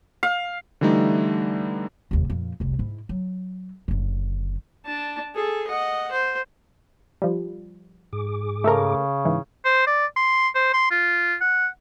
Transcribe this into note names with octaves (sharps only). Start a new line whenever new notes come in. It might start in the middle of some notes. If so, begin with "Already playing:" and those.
F5
D3 E3 G3 A3 D#4
F1 D#2
F2 A#2
F1 C2
G#2 E4
F#3
F#1 D3
D4 A5
G#4 A4
D#5 F#5
C5
F3 G3
G#2 G#4 D6
C#3 A3 A4 A#4
G#2 E3
C5
D5
C6
C5
C6
F4
F#5